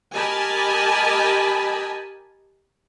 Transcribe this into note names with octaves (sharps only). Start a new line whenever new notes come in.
G4 A#4 D#5 G#5 A5 B5